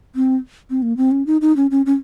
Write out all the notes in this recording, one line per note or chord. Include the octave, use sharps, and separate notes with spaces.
C4
C4
A#3
C4
C#4
D#4
D#4
C#4
C#4
C#4